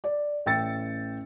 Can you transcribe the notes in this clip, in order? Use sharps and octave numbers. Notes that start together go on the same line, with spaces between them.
D5
A1 G5 E6 A6 C#7